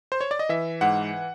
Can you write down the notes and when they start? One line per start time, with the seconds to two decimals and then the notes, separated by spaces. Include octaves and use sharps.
0.12 C5
0.21 C#5
0.31 D5
0.39 D#5
0.49 E3 E5
0.81 G#2 F#5